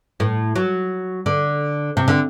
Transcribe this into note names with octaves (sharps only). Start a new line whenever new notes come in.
A2
F#3
D3
C3
D3